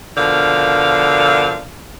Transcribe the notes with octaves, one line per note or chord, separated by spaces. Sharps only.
B2 D3 F3 A#4 F5